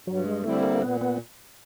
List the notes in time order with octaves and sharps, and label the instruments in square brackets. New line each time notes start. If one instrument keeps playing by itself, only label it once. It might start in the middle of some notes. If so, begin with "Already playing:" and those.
[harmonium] G2 [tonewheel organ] F#3
[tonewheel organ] G#3
[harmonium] D3 G3 C4 E4 [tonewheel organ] A3
[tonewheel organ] A#3
[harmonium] A#2 [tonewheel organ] B3
[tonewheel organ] B3